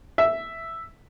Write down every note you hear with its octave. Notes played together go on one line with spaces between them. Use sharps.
E5